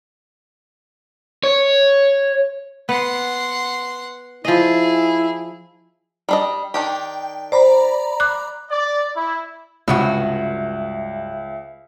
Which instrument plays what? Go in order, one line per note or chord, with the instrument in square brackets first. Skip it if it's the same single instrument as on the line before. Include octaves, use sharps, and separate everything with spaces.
[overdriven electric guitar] C#5
[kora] B3 [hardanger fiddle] F#5 C6
[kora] F3 D#5 [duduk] E4 [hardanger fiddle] G#4
[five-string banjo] G3 D4 D#5
[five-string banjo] D#3 D4 G4 [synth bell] G5
[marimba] C5 [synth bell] D5 A#5 B5
[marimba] D6 F#6
[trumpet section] D5
E4
[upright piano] C#2 [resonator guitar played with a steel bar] G2 G#3 F#4 [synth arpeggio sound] C3 E6 [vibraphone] E5